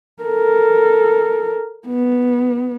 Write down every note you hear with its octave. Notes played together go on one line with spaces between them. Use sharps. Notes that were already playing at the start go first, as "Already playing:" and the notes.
A4 A#4
B3